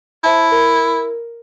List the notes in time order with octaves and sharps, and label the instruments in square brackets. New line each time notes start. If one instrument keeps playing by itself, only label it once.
[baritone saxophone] E4 [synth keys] C5 E5 A5
[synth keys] A#4